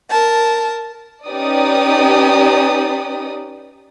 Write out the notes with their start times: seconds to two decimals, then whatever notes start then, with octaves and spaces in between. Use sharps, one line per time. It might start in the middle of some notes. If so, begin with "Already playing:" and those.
0.10 A#4 A5
1.27 C#4 D#4 G4 B4 D5 D#6